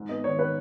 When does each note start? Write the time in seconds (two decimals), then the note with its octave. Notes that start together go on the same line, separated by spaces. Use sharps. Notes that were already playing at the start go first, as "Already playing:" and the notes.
Already playing: G#2
0.09 B3 D#5
0.24 D#3 C#5
0.39 B4